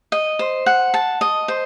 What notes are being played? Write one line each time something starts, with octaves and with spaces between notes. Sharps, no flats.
D#5
C5
F#5
A5
D#5
C5